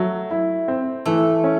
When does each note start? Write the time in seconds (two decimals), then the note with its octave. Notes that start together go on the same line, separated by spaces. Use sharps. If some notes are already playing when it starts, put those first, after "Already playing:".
Already playing: F#3 A3
0.31 E4
0.68 C4
1.05 E3 A3
1.44 C#4